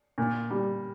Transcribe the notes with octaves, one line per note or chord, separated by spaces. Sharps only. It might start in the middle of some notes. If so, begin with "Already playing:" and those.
A#2
G3